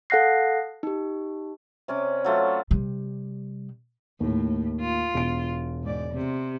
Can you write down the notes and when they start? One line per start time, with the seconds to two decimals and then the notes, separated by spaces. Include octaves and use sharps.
0.10 A4 F5 F#5 F#6 A#6 C7
0.83 D#4 G4
1.88 C3 C#4 D5
2.24 F#3 A3 F4
2.71 C3 G3
4.20 D#2 A2
4.81 F4
5.14 E1 D7
5.83 G#2 D5
6.13 C3